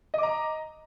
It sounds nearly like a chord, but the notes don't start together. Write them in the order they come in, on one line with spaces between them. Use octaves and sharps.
D#5 D6 A#5